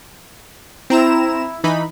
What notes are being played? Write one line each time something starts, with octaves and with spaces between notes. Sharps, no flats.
C4 E4 A#5 E7
E3 D#4 B5